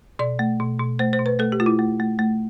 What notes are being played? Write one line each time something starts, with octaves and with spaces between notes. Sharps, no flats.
B2 D5
A3
B2
B2
A3 C5
C5
B2
B4
A3 A4
G4
A3 F4
E4
A3
A3
A3